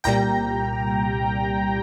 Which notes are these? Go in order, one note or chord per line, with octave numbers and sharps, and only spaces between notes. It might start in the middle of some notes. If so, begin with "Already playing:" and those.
C2 A#2 G3 G5 A#5